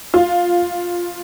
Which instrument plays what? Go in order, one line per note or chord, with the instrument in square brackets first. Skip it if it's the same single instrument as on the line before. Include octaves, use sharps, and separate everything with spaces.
[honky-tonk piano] F4